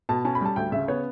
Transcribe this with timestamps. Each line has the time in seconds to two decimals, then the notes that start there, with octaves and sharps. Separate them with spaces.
0.09 B2 A5
0.25 C#4 A5
0.35 B5
0.41 G3 A5
0.56 D2 G5
0.72 C#3 E5
0.88 B3 C#5